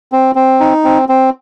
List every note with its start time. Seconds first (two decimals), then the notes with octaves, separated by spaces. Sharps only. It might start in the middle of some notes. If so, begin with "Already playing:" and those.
0.12 C4
0.35 C4
0.60 D#4
0.85 C4
1.09 C4